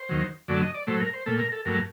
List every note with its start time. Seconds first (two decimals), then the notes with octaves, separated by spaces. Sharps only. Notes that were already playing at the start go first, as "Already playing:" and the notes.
Already playing: C5
0.09 D#2 D#3 F#3
0.48 F#2 D3 F#3 A3 D5
0.62 D#5
0.74 D5
0.87 A2 F#3 A3 C5
1.00 A#4
1.13 C5
1.26 A#2 A3 A4
1.39 A#4
1.52 A4
1.65 G2 F#3 A3 A#4